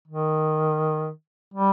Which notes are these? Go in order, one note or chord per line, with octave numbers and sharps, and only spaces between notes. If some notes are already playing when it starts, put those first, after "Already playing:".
D#3
G3